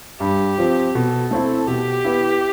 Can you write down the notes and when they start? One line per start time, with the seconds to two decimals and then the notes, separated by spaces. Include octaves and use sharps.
0.20 G2 G4
0.58 F3 C4
0.95 B2 A4
1.31 A3 C4 E4
1.68 B2 G4
2.04 B3 E4